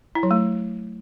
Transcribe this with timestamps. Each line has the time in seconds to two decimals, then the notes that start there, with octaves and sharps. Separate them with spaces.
0.15 E4
0.23 F#3
0.31 A3